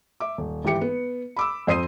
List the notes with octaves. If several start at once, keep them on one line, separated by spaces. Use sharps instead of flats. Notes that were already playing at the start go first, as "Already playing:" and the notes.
E5 D6
D#1
G#1 E3 G4 C#7
B3
B5 D6 E6
F2 C5 D#6 C7 D#7